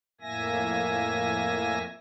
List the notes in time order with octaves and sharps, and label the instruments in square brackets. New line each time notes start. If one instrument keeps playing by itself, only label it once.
[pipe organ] F2 A2 A#3 E5 G#5 A#6